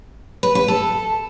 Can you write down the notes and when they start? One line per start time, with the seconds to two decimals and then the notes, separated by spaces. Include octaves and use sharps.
0.43 B4
0.55 B4
0.68 A4